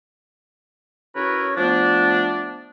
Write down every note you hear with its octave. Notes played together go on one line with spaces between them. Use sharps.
C#4 E4 F#4 A#4 B4 C#5
F3 A3 B3 D4